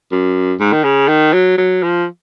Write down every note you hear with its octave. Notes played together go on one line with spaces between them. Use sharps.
F#2
G#2
D#3
C#3
D#3
F#3
F#3
F3